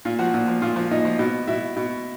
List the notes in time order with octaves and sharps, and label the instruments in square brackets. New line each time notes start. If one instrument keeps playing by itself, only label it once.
[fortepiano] A#2 F4
F3 F#4
A#2
F3
A#2 F4
F3
A#2 D#4
F3
B2
B2 E4
B2